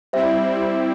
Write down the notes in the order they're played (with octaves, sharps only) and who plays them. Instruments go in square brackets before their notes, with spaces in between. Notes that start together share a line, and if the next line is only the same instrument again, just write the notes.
[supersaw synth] G3 C4 E4 [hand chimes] C5 E5